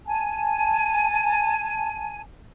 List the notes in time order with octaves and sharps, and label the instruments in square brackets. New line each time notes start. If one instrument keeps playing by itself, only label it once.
[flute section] G#5 A5